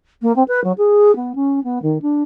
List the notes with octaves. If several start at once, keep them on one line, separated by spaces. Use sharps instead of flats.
A#3
C4
B4
F#3
G#4
B3
C#4
B3
D#3
D4